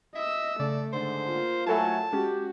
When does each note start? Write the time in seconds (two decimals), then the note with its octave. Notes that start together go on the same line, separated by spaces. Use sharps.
0.15 D#5 E5 E6
0.60 C#3 A3 D5
0.93 G#2 D3 C5
1.27 A#3 F4
1.66 F#3 A3 E4 A4 E5 G#5 A5
2.13 G#3 C#4 F#4 G4